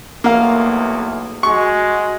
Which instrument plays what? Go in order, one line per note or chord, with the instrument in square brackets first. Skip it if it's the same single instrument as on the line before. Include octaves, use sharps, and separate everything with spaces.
[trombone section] B1 E2 A3 [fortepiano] A#3 F5
[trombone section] G#3 F#4 [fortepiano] C#6